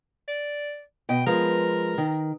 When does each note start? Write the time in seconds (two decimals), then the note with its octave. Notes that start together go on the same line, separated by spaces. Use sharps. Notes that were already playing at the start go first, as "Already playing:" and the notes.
0.28 D5
1.09 B2 D#5 G5
1.26 F3 G#3 A#4 B4
1.98 D#3